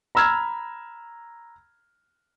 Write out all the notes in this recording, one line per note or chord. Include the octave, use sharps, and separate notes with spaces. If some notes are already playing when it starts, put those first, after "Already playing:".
A#5 B5 E6 F6 G#6